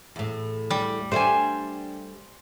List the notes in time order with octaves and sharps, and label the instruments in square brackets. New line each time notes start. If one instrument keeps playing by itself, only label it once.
[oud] E2 A2
[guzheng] G3
[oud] G3 A3 D4 [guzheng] C5 G#5